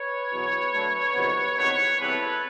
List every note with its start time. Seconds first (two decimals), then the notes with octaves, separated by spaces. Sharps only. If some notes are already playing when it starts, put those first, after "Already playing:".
Already playing: B4 C#5
0.32 E2 B2 F#3
0.72 D3 F#3 A3
1.14 F2 C3 D#3 F#3 B3
1.57 E2 C3 D#3 F#3 A3 B4 C#5
1.99 E2 C3 E3 G3 A4 B4